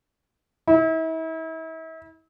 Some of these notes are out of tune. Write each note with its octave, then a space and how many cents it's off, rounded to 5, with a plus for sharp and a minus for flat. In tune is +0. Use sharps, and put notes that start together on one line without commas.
E4 -40